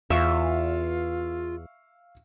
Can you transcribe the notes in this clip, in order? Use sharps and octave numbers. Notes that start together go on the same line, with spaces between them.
E2 F4 E5 F5 C#6 E6